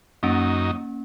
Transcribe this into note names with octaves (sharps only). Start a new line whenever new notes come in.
F#2 A#3 C#4 D#4